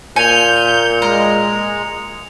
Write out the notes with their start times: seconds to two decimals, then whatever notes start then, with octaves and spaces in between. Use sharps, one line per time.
0.16 A#2 G#5 G6 C#7 F7
1.02 G#3 A#4